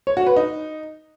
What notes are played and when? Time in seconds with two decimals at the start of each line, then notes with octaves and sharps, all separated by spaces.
0.07 C#5
0.17 F#4
0.27 B4
0.36 D#4